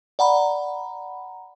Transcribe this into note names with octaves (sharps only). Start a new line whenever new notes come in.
D5 F#5 A#5 B5